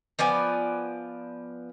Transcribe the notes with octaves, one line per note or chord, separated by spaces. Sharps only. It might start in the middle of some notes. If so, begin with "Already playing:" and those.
F3 B3 D5 G#5